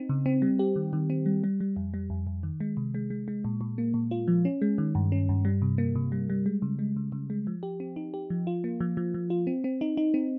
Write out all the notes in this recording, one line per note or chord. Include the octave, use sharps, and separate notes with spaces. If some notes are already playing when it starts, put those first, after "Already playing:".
Already playing: C4 D#4
C#3
C4
G3
G4
D#3
D#3
C4
G3
G3
G3
F2
G3
F2
F2
D#3
G#3
C3
G#3
G#3
G#3
A#2
A#2
A#3
A#2
F4
F3
C#4
G#3
D#3
G2
C#4
G2
G3
C3
A#3
C3
G3
G3
G#3
C#3
G#3
C#3
C#3
G#3
F3
G4
C4
D#4
G4
F3
F4
A#3
F3
F3
F3
F4
C4
C4
D#4
D#4
C4